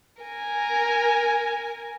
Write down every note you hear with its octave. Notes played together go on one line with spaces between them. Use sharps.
A#4 G#5